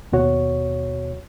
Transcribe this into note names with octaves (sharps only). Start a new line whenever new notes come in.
D#2 B2 F#4 C#5